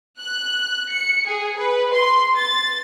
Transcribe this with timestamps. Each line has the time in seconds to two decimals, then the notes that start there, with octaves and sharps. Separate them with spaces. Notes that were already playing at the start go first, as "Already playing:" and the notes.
0.19 F#6
0.90 C#7
1.26 G#4
1.58 B4
1.94 C6
2.37 A6